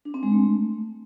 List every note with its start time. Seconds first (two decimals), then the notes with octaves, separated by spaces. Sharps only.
0.05 D4
0.14 C4
0.23 G#3
0.32 A3